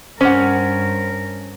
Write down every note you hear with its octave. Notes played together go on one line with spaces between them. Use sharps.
G2 C#4 A#4 C5 F#5